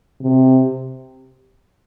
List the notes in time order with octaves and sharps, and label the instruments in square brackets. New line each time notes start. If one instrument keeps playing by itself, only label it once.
[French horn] C3